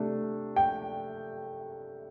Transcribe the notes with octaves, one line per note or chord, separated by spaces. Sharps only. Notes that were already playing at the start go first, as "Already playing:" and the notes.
Already playing: C3 A3 D4
G5